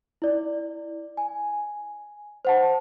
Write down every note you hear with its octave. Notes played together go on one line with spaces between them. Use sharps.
E4 D5
G#5
C5 F#5 A5